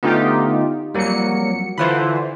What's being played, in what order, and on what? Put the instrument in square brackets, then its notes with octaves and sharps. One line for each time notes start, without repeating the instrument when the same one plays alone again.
[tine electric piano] D3 A3 B3 [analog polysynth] D#4 F4 G4
[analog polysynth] F2 F#3 C#7 [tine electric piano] G3 A#3
[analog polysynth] D3 E3 C5 [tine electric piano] F4 B4 B5